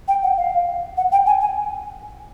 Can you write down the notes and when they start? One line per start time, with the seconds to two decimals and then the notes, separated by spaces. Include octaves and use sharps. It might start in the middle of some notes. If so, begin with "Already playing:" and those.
0.08 G5
0.23 F#5
0.38 F5
0.97 F#5
1.12 G5
1.26 G#5
1.41 G#5